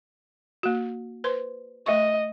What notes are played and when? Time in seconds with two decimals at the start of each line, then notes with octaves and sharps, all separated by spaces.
0.63 A#3 F#4
1.24 B4 C5 C6
1.86 A3 D#5 E5 C#6